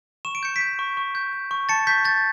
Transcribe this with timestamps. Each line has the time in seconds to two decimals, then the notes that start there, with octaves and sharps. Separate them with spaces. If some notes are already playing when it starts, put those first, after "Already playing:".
0.25 C#6 E7
0.35 D7
0.43 G6 C#7
0.56 B6 D7
0.61 G6
0.79 C#6
0.97 C#6
1.15 G6
1.33 G6
1.51 C#6
1.69 A5 A6 C#7
1.87 C#6 G6 B6
2.05 G6 A6